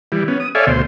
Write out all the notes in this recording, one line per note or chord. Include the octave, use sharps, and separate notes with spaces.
E3 G3
B3 C#4
D#6
A4 C#5 D5 E5 F5 G#5
D2 B2 C5